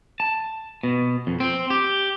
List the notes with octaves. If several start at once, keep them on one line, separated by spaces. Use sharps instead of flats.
A5
B2
F2
C4
G4